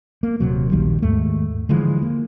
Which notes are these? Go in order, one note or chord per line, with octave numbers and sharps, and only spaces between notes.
A#3
D#1 C3 F#3
A#1 D#2 D#3 G3
D#2 G#2 A3
D3 E3 F3 G#3
A#3